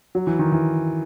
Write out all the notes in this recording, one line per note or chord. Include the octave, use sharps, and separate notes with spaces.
F#3
E3
D#3
E3